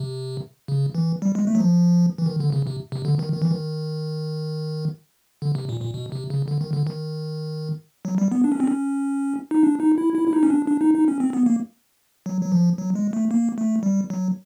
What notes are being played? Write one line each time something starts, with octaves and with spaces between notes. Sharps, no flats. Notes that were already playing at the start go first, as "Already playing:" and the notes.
Already playing: C3
C#3
E3
G3
G#3
A3
F#3
F3
E3
D#3
D3
C#3
C3
C3
D3
D#3
D#3
E3
D#3
D3
C3
A#2
A#2
B2
C3
C#3
D3
D#3
D3
D#3
F#3
G3
B3
D4
C#4
C4
C#4
D#4
D4
D#4
E4
E4
E4
D#4
C#4
D4
D4
D#4
D#4
C#4
C4
B3
A#3
F#3
F#3
F3
F#3
G#3
A3
A#3
A3
G3
F#3